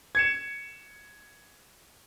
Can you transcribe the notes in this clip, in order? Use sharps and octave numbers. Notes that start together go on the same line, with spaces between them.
G#6 C#7 E7